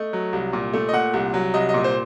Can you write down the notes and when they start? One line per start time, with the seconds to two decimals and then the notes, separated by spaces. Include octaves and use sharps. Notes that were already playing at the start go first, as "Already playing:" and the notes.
Already playing: A3 D#5
0.13 F#3
0.33 C2
0.53 A#2
0.74 A3
0.89 D#5
0.93 A#2 F#5
1.13 C2
1.34 F#3
1.54 C2 D#5
1.69 D#5
1.74 A#2
1.84 C5